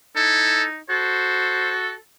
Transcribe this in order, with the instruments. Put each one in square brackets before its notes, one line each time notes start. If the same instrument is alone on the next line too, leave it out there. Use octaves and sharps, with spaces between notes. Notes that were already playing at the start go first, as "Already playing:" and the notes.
[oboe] D#4 [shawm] E4 [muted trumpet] A4
[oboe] F#4 [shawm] A4 [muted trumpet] C5